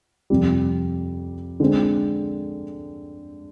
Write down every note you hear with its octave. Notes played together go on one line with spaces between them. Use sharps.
F2 C3 G3
D3 G#3 C4